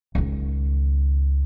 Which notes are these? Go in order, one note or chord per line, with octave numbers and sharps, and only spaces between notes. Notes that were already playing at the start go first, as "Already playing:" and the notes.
C#2 D#3